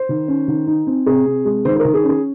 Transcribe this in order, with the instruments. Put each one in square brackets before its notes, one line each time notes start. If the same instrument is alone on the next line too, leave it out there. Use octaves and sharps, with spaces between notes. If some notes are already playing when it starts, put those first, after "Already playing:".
Already playing: [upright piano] C5
D#3
C#4
D#3
D#4
C4
C3 G#4
C3
G#3
D#3 C5
C5
A#4
D#3
G#4
C#4
G#4